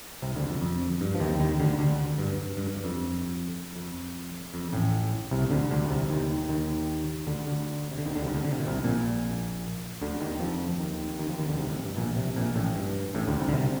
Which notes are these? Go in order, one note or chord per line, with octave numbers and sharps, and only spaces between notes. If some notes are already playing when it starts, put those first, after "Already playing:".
C2 C3
D2 D3
F2
F2
G2
F3
D#2 D#3
D#2 D#3
D2 D3
D2 D3
G2
G2
G2
G2
F2
F2
F2
A1 A2
C2 C3
D2 D3
D2 D3
C2 C3
D#2 D#3
D#2 D#3
D2 D3
D2 D3
C3
D3
D#2 D#3
D2 D3
C2 C3
D2 D3
D3
C3
A#2
C2 C3
A#1 A#2
D2 D3
D#2 D#3
F2 F3
D#2 D#3
D#2 D#3
F2 F3
D#2 D#3
D2 D3
C2 C3
A1 A2
G2
A#1 A#2
C2 C3
A#1 A#2
A1 A2
G2
A1 A2
D2 D3
C2 C3
D3
C2 C3